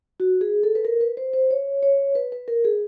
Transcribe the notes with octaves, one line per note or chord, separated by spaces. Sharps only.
F#4
G#4
A4
B4
A#4
B4
C5
C5
C#5
C#5
B4
B4
A#4
G#4